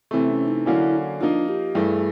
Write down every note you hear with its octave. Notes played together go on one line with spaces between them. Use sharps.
C3 E3 A3 C4
C#4
D#4
D3 F#3 A#3 C#4 E4
F3 A#3 D4 D#4
G4
G2 E3 A3 G#4